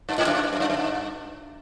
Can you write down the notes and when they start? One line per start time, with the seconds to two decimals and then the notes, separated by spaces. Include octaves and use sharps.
0.09 G2
0.18 G#2
0.27 F#2
0.35 G2
0.43 G#2
0.53 F#2
0.60 G2
0.70 F#2
0.77 G2